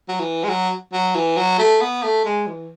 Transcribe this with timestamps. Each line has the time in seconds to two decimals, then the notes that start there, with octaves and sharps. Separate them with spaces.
0.08 F#3
0.20 E3
0.44 G#3
0.49 F#3
0.93 F#3
1.15 E3
1.37 F#3
1.59 A3
1.81 B3
2.03 A3
2.25 G#3
2.47 E3